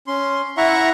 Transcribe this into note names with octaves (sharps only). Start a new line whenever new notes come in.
C#4 C6
E4 E5 F#5 A#5 C#6